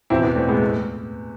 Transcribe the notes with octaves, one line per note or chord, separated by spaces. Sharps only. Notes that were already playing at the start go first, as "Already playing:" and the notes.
E2 B2 C4 E4
B3 D4
A3 C4
G#3 B3
A3